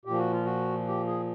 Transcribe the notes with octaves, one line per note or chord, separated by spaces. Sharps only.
A#2 G4
F3
F#4
F4
F#4
G4
G#4